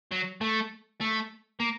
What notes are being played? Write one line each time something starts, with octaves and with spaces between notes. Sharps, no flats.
F#3
A3
A3
A#3